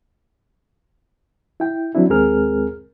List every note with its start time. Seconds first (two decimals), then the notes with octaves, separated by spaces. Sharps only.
1.60 E4 G5
1.95 F#3 C4 D4 E4
2.09 D#2 G#3 C4 G#4 A#4 F6